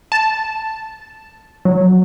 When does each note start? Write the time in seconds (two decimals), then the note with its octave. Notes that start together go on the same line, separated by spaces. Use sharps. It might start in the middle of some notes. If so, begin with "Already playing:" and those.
0.12 A5
1.65 F#3